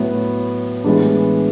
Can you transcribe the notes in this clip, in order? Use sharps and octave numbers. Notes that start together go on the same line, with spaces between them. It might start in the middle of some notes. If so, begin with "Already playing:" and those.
Already playing: A2 F#3 B3 E4
A2 E3 G#3 B3 D4